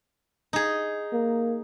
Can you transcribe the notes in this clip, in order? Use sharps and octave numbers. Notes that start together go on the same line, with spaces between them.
D#4 G#4
A#3